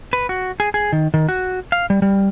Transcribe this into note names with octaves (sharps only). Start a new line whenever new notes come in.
B4
F#4
G#4
G#4
D#3
D#3
F#4
F5
G3
G3